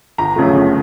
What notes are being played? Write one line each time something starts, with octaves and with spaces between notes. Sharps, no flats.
G1 A#5
F#2 C#3 F3 A3
G1